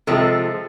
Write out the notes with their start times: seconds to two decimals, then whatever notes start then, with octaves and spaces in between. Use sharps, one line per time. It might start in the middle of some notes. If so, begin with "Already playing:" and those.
0.07 C3 F3 G#3 A4